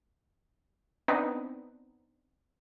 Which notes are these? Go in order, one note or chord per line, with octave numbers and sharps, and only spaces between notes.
B3 C4 D4 D#4 B4